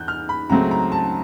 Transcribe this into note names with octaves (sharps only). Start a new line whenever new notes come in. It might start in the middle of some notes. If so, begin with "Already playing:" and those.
Already playing: E2 F#6 G6
F6
B5
C#2 C#3 F#3 A3 C4 A#5
A#5
A5